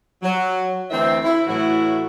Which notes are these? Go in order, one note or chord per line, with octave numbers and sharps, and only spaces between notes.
F#3
D2 E3 C4 E5
E4
A2 E3 F#3 E4 F#4